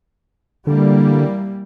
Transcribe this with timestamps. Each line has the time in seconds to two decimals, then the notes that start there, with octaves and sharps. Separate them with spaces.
0.67 D3 E3 G3 A#3